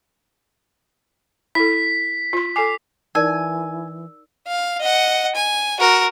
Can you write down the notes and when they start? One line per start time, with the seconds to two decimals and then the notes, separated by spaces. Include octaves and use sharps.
1.55 E4 A4 B6
2.33 F4 C6
2.56 A4 G#5 D6 C7
3.15 E3 D#4 A#4 D5 G#5 E6
4.47 F5
4.80 D#5 F#5
5.35 G#5
5.80 F#4 A#4